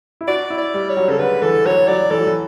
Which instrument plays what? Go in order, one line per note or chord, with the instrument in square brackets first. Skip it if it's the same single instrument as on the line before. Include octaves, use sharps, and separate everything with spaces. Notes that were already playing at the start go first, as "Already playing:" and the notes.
[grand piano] E4
[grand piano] F#4 [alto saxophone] D5
[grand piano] E4
[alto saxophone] D5
[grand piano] G3
[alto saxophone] C#5
[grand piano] F#3
[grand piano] C#3 [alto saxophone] A4
[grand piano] D3 [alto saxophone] B4
[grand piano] E3 [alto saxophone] A4
[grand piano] F#3 [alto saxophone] C#5
[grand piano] F#3 [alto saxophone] D5
[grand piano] E3 [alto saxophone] A4
[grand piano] F#3
E3